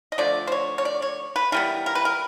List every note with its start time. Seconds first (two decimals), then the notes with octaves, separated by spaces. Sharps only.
0.12 D#5
0.18 D3 F3 A3 D5
0.47 C5
0.52 C#5
0.78 C#5
0.85 D5
1.02 C#5
1.36 B4
1.52 E3 G3 B3 A#4
1.86 A#4
1.95 B4
2.05 A#4